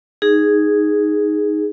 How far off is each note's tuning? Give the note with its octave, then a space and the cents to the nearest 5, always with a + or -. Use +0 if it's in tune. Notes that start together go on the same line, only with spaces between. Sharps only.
D#4 +0 G#4 +0